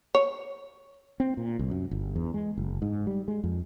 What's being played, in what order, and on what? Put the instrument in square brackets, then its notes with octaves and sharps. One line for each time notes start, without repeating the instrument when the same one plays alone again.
[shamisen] C#5
[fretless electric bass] C4
A#2
C2
F#2
G1
E2
G#3
F#1
G#2
G3
G#3
F2